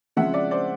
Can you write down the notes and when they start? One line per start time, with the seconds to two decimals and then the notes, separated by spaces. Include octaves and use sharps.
0.16 C#3 F3 G#3 C4 E5 F#5
0.34 D5 E5
0.51 C5 D5